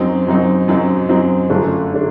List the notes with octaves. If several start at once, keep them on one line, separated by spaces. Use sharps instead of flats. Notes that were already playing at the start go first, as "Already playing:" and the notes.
Already playing: F#2 F#3 C4 D#4
F#2 F#3 C4 D#4
F#2 F#3 C4 D#4
F#2 F#3 C4 D#4
G1 F#2 D3 A3 D4
D3 A3 D4